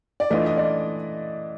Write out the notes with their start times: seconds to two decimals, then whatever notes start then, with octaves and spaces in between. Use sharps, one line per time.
0.20 D5
0.30 E3 A3 D4 F4 D#5
0.46 D#5
0.57 D5